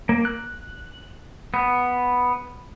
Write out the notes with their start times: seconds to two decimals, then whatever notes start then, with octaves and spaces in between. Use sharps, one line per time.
0.09 A#3
0.25 F#6
1.54 B3